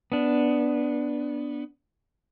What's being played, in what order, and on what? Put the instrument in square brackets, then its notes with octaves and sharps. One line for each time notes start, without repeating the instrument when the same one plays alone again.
[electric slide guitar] B3 D4